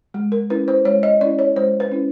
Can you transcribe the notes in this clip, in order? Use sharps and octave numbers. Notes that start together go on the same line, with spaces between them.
G#3
A#4
C#4 E4 B4
C5
G#3 C#5
D#5
C#4 E4 D5
C#5
G#3 C5
B4
C#4 E4